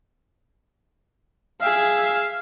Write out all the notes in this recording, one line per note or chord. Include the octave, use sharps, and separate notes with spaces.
G#4 E5 F5